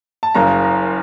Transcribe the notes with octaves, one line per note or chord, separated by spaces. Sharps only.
A5
F#1 F#2 C#3 A#5
A#5